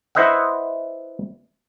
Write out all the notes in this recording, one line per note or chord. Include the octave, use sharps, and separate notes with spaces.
E4 B4 C5 D#5 E5 F#5